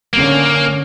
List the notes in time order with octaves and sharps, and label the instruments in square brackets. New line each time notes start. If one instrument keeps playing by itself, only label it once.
[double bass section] D3 C#4 [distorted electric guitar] A#3